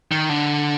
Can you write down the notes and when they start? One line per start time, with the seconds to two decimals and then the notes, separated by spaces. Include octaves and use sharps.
0.12 D#3
0.30 D3